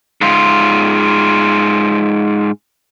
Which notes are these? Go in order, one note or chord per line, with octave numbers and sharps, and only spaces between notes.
G#2 F4